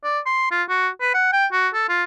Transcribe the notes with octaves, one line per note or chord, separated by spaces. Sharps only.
D5
C6
F4
F#4
B4
F#5
G5
F#4
A4
F4